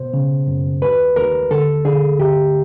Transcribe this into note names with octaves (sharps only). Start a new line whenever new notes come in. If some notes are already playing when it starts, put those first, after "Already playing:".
Already playing: B2 C5
C#3
F#2
D#2 B4
D#2 A#4
D3 A4
D3 G#4
D2 G4